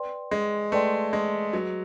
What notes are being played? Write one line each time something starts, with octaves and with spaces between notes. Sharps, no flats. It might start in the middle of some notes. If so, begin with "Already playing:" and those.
Already playing: B4 D5 G5 C6
G#3
A3 B4 D5 G5 C6
G#3
F#3 G#4 B4 D#5